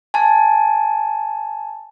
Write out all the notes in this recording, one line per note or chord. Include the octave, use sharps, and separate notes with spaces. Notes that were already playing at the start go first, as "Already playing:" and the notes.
G#5 A5